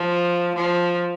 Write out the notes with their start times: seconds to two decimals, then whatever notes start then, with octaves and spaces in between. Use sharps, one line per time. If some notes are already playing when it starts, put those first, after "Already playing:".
Already playing: F3
0.56 F3